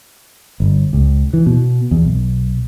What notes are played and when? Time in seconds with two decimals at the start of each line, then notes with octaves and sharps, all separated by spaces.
0.60 G1
0.93 C#2
1.33 E3
1.46 B2
1.91 E2
2.05 B1